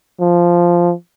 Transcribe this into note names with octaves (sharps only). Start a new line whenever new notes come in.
F3